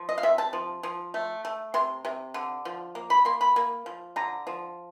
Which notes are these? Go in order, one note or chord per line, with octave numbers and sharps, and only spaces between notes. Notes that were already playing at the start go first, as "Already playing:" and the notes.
Already playing: F3
D#5
F5
C3 E5
A5
F3
F3
A3
A3
C3 C6
C3
D3
F3
A#3
B5
A#3 C6
B5
A#3
F3
D3 A#5
F3